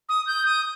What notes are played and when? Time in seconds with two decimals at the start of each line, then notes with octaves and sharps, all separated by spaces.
0.09 D#6
0.27 G6
0.45 D#6